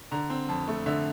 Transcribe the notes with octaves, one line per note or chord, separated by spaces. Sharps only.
D3 A#5
C4
F2 A5
A3
D3 E5